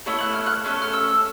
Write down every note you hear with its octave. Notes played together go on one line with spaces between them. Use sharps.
A3 C#4 E4 A4
F#6
F6
F#6
A3 C#4 A4
F6
E6